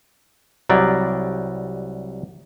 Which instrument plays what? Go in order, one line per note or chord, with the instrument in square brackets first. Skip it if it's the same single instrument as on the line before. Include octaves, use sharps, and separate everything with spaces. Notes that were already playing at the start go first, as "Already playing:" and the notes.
[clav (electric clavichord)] C2 F#3 G3 D5